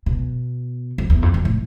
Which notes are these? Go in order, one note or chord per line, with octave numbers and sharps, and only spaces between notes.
B2
F2
E2
F2
F2
A2